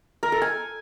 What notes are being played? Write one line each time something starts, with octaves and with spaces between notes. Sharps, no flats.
A#4
A4
G#5